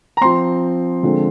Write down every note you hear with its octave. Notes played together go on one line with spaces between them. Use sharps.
A#5
F3 C4 C6
D3 F3 G#3 C4